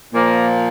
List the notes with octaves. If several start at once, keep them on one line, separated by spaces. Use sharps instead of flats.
A#2 F3 A#3